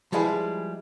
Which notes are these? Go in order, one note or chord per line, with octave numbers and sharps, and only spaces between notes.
F3 G3 G#3 E4 G#4 B4